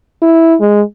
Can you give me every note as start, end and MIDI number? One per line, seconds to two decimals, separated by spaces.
0.22 0.55 64
0.60 0.82 56